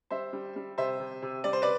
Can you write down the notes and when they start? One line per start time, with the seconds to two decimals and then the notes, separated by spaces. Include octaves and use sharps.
0.11 G3 C5 E5
0.33 G3
0.56 G3
0.78 C3 C5 E5
1.00 C3
1.22 C3
1.44 G3 D5
1.53 C5
1.62 B4 D5